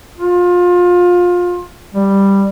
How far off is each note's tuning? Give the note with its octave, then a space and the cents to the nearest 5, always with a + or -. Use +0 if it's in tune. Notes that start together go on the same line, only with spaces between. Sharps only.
F4 +25
G3 +5